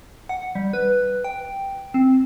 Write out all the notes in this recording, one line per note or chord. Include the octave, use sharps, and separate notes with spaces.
F#5
G3
B4
G5
C4